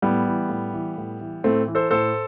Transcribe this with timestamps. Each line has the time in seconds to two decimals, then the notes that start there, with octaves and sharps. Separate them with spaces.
0.02 A2 G3 B3
0.27 E3
0.49 A2
0.73 E3
0.97 A2
1.21 E3
1.44 A2 A3 C4
1.67 E3
1.75 A4 C5
1.91 A2 A4 C5